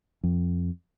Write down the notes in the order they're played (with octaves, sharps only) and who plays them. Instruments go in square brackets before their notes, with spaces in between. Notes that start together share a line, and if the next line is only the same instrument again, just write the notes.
[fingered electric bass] F2